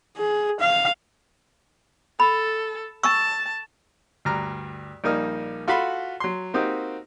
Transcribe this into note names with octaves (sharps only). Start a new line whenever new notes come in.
G#4
F5
A4 B5
A5 C#6 E6
D2 G2 A#5 F6
A#1 G3 A#3 D#4 F6
F4 F#4 A4 A5 B5 C6
F#3 C6
A#3 C4 D#4 F#4 G4